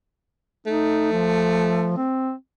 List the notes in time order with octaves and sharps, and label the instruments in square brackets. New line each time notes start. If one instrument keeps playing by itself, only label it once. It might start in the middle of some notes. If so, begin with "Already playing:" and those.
[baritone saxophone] A3 [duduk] D#4
[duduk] F3
C4